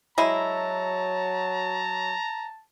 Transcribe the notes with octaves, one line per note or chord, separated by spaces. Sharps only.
F#3 G#3 E4 A5 A#5